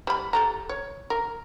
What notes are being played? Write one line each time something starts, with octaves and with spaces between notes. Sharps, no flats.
G3 B5
G4 A4 A#5
C#5
A#4